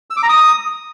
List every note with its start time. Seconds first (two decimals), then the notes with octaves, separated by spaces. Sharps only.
0.10 E6
0.17 D6
0.23 A#5
0.29 D#6